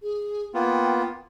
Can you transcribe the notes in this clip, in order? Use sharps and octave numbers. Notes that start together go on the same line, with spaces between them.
G#4
A#3 B3 F4 G5